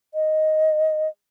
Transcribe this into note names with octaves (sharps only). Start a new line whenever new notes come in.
D#5